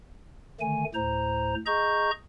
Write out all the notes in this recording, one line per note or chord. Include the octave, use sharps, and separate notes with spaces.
D3 D#3 A3 G#5
D2 A2 C5 A#5
G#4 D#5 A#5 C#6 G6